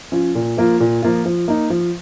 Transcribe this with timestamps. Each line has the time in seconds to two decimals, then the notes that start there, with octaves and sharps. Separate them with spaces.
0.12 F3 C#4 F4
0.35 A#2
0.57 F3 A#3 F4
0.80 A#2
1.02 F3 A#3 F4
1.26 F3
1.48 A#3 D#4
1.70 F3